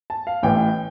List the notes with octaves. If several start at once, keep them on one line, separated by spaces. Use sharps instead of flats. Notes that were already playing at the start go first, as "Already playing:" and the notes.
A5
F5
A1 A2 E3 G5